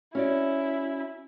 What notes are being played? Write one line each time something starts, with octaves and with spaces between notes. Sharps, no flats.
C#4 E4 F#4 D5